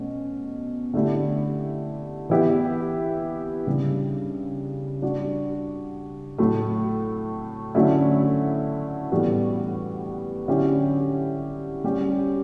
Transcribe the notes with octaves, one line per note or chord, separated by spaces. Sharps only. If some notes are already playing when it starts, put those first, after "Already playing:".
Already playing: B2 A3 C#4
D3 A3 E4 G4
E3 B3 E4 G4
C#3 G3 D4
G3 D4 F#4
A2 F#3 A3
D3 F#3 A3 C#4 E4
A2 E3 G3 B3 F#4
D3 F#3 C#4 E4 G4
G3 C#4 G4